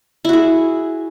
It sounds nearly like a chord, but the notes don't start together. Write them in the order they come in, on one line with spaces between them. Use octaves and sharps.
E4 F#4 G#4